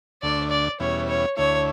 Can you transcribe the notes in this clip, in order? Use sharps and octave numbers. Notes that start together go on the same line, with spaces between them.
D2 D3 A3 D4 D5
D5
E2 B2 G3 C#4 E4 C#5
C#5
D2 D3 A3 E4 C#5